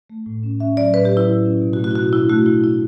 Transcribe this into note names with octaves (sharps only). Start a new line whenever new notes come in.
A3
A2
C#4
C#4 E5
F#3 D5
A2 B4
G4
F#3
E4
A2
C#4
B2
F#4
A3
F#4
E4
B2 F#4
D4 E4
A3 F#4
B2 E4
A3 E4